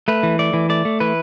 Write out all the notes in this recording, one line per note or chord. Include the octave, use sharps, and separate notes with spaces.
A3 B4
E3
A3 D5
E3
A3 D5
A3
E3 B4